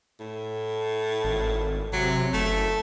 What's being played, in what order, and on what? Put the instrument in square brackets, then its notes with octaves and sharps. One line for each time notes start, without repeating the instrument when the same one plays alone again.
[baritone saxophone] A2
[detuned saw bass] G#1
[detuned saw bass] C3 [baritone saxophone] F#3
[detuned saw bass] F#1 [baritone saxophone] A3